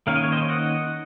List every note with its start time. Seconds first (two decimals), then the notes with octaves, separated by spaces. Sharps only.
0.07 D#3 A#3 C#4 F5
0.16 D#5
0.24 C#5
0.32 C5 D#5
0.49 D#5 F#5